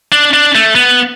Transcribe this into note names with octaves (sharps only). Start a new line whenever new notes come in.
D4
D4
A3
B3